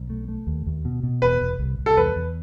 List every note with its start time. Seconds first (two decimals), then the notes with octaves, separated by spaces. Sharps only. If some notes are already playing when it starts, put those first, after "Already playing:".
Already playing: B1
0.10 A3
0.28 A3
0.47 D#2
0.66 D#2
0.85 B2
1.03 B2
1.22 E1 B4
1.41 E1
1.60 C2
1.79 C2
1.86 A4
1.97 E2 B4
2.16 E2